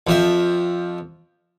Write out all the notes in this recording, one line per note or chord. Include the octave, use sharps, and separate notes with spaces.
F2 F3 E5